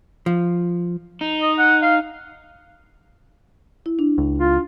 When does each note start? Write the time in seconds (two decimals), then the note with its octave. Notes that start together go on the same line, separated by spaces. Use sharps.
0.26 F3
1.21 D#4
1.42 D#5
1.58 F#5
1.82 F5
3.86 E4
3.99 D4
4.18 C#2
4.38 F4